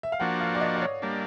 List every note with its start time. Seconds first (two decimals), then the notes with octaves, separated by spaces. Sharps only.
0.03 E5
0.12 F5
0.20 F3 A#3 D4 F#4 F#5
0.41 F5
0.55 D5
0.61 D#5
0.76 D5
0.82 C#5
1.02 G3 A#3 D4